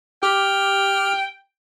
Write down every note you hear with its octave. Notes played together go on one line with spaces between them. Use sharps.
G4 G5 F6